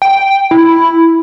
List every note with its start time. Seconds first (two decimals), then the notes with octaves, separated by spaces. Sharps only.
0.02 G5
0.51 E4